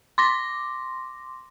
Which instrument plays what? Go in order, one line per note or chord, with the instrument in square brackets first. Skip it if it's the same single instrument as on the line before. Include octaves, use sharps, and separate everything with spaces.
[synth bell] C6 D6 A#6